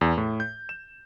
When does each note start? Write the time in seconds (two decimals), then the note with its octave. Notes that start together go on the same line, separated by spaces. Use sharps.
0.01 E2
0.18 A2
0.40 G6
0.69 E7